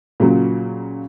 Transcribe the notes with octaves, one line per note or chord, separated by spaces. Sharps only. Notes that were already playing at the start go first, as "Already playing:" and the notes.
A#2 C#3 F#3